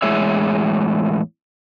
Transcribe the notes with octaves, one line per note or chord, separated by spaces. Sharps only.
E2 A2 G#3 G#4 C#5 E5